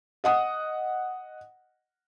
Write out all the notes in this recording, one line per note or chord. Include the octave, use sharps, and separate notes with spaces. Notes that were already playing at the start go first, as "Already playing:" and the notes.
D#5 F#5 D#6